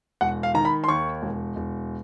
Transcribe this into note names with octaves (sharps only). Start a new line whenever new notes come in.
E1 F#5
F5
D#3 A#5
B5
C6
D#2 C#6
E1
E1